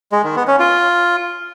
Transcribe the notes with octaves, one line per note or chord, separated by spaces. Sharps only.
G#3
D#3
B3
C#4
F4